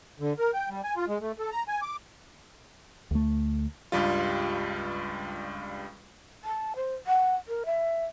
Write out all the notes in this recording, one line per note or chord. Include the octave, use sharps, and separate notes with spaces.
D3
A#4
G5
G3
G#5
F4
G#3
A3
A4
A#5
G#5
D6
D2 A3
C#2 G2 G3 F4
A5
C5
F#5
A#4
E5